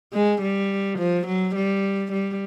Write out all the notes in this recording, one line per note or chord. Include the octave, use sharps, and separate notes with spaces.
G#3
G3
F3
F#3
G3
G3